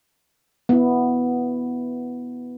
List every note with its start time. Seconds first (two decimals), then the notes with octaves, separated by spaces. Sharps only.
0.69 B3 E4